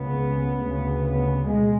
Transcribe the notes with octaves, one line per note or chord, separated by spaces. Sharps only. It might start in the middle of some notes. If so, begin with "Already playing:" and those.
Already playing: C#2 C#3 B3
D2 C#3
B3
B2 G#3